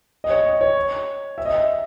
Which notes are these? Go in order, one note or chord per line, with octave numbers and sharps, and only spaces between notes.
D#5
C#5
D#5
C#5
E5
D#5
E5